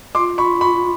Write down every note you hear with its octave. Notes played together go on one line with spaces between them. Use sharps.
F4 C6 D6
B5 C#6
B5 C#6